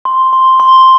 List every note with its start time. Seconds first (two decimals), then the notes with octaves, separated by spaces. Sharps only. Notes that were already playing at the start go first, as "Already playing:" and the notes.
0.05 C6
0.33 C6
0.60 C6